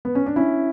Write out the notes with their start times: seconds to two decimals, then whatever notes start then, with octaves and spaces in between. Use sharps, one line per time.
0.05 B3
0.15 C#4
0.26 D4
0.36 C#4 E4